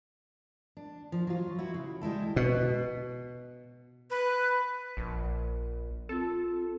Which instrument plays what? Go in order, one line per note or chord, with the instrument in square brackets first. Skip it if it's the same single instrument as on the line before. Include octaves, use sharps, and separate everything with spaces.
[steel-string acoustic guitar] D4
F3
F#3 F4
E4 F#4
C#3
G3 G#3 E4 A4
[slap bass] B2
[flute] B4
[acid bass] A#1
[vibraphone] C4 F4 [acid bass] A4